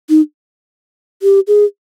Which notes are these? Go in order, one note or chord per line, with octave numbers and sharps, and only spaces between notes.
D#4
G4
G#4